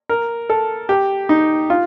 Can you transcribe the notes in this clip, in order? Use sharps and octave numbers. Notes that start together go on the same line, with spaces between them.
A#4
A4
G4
D#4
F4